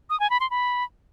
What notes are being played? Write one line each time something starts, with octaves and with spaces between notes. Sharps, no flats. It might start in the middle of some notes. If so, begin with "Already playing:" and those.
D#6
G#5
B5
C6
B5